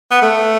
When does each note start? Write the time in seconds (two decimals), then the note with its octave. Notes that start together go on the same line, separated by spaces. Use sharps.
0.11 B3
0.22 A3